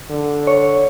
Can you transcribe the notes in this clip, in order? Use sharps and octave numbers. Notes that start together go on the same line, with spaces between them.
D3
C#5